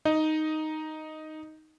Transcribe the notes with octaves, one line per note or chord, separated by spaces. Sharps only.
D#4 D#5